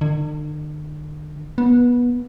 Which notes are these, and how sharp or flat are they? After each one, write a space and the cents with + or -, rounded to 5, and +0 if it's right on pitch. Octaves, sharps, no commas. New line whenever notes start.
D3 +45
B3 -20